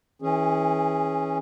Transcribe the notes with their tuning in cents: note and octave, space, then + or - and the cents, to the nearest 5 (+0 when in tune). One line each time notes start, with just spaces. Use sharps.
E3 -30 C#4 -15 G#4 +0